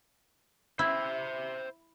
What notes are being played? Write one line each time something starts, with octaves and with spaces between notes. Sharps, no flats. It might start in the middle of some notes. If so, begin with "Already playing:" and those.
E4 C5 E5